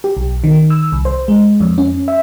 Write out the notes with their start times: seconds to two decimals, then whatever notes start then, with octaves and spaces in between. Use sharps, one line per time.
0.04 G4
0.17 B1
0.44 D#3
0.70 E6
0.92 C2
1.05 C5
1.28 G#3
1.60 F2
1.78 C#4
2.08 E5